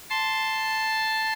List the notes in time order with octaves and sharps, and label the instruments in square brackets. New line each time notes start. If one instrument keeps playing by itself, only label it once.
[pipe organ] A5 C6